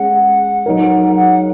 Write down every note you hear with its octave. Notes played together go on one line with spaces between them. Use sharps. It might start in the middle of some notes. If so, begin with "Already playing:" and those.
Already playing: G#3 C#4 G#4 F#5
F#3 D#4 A#4
F#5